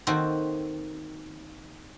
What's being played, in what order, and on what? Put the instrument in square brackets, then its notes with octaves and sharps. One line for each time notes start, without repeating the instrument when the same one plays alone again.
[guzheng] D#3 A#3 C4 F#4 A4 C5